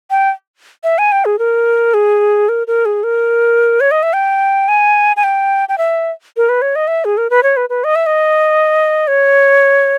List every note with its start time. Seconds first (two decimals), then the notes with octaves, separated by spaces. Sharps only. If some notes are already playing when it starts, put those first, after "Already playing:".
0.11 G5
0.84 E5
0.98 G#5
1.12 G5
1.25 G#4
1.39 A#4
1.94 G#4
2.49 A#4
2.67 A#4
2.85 G#4
3.04 A#4
3.81 C#5
3.91 D#5
4.03 E5
4.13 G5
4.68 G#5
5.17 G#5
5.24 G5
5.69 G5
5.78 E5
6.37 A#4
6.49 B4
6.62 C#5
6.76 D#5
6.88 E5
7.05 G#4
7.17 A#4
7.30 B4
7.43 C#5
7.57 B4
7.69 B4
7.84 D#5
7.95 E5
8.06 D#5
9.08 C#5